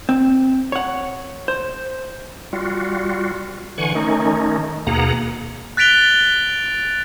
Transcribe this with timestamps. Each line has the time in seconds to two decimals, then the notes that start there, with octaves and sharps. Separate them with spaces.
0.09 C4
0.72 C#5 F#5
1.48 C5
2.53 G3 F4 F#4
3.78 D3 E3 F#5 G#5 C#6
3.95 D#3 A3 C#4 D#4
4.87 D#2 B2 A#3 G#4 F#5 A#5
5.77 F#6 A6 B6 D7 F7 G7